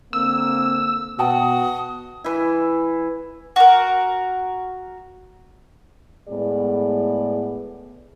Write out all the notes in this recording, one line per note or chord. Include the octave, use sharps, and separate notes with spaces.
D3 A#3 C4 E6
B2 F#4 G5 A5 D#6
E3 E4
F#4 A#4
A2 G#3 B3 G#4 D5